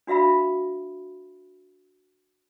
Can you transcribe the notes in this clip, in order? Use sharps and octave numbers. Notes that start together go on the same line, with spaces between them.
D4 F#4 E5 F5 B5